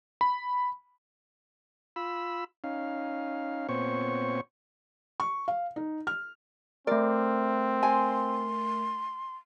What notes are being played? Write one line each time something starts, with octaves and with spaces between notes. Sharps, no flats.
B5
F4 B5 E6
C#4 D#4 F5
A#2 B3 C4 C5 C#5 C#6
C#6
F5
D#4
F6
A3 C4 A#4 D5
G#5 C6